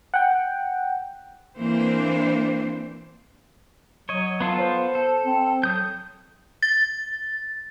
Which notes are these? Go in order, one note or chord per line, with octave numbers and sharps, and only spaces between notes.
F#5 G5
E3 A#3 C4 D4 C5
F#3 C#5 D#5
B3 F4 A4
C5
A4
C4
F#3 A4 D#6 G6
A6